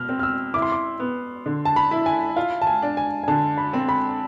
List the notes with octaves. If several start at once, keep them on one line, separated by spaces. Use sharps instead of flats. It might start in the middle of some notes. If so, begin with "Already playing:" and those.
Already playing: B2 F6
C4
F6
E6
E4 D6
C6
D6
B3
D3
A5
B5
E4
G#5
F4 F5
A5
G#5
D4
G#5
G#5
D3 A5
B5
C4
B5